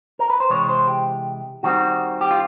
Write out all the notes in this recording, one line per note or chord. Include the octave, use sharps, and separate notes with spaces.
A#4
B4
C5
C3 E3 G#3 C#5
C5
G4
D#3 G3 C4 F#4
G4
F4